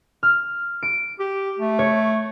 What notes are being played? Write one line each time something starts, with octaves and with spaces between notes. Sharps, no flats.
F6
D7
G4
A3
C#5